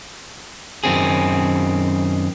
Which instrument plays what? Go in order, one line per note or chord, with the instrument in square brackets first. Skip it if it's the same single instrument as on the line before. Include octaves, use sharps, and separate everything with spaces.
[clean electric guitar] F#2 D#3 C4 G#4